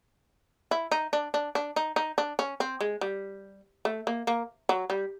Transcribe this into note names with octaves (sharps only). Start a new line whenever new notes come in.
E4
D#4
D4
D4
D4
D#4
D#4
D4
C#4
C4
G#3
G3
A3
A#3
A#3
F#3
G3